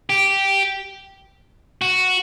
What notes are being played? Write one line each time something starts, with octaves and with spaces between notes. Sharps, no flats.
G4
F#4